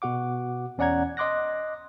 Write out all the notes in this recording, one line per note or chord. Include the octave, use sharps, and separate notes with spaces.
B2 F#4 F#5 D6
E2 C#4 D5 F#5 A#5 G#6
D#5 C6 D6 F#6 A#6